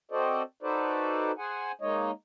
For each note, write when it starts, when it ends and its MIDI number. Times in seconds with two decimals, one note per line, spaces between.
0.11 0.42 60
0.11 0.42 66
0.11 0.42 69
0.11 0.42 72
0.11 0.42 74
0.11 0.42 75
0.63 1.32 63
0.63 1.32 66
0.63 1.32 69
0.63 1.32 71
0.63 1.32 72
0.63 1.32 74
1.38 1.72 68
1.38 1.72 72
1.38 1.72 78
1.38 1.72 80
1.81 2.11 56
1.81 2.11 58
1.81 2.11 63
1.81 2.11 73
1.81 2.11 75